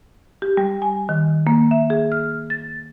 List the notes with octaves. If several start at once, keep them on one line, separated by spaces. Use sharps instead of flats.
G4
G3
G#5
D#3
A#3
E5
G#4
F6
A6